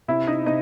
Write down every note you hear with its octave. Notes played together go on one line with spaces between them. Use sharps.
C3 E4 E5
D#4 D#5
C3 D#4 D#5